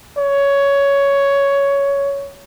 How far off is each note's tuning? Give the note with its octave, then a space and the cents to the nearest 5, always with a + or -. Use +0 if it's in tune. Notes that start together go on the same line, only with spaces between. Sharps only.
C#5 +10